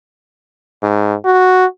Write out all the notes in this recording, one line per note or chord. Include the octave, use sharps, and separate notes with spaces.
G#2
F#4